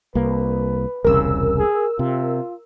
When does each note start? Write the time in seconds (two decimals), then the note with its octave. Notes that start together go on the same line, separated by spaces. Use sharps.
0.15 C2 A#3 B4
1.05 E1 C2 C#3 A#4 E6
1.59 G#4
1.99 C3 F4